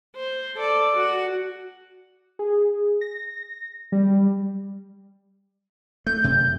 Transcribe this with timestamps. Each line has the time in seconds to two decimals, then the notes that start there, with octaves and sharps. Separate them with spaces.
0.16 C5
0.57 A4 D5
0.97 F#4
2.39 G#4
3.01 A#6
3.92 G3
6.06 A3 G6
6.24 F#2 C3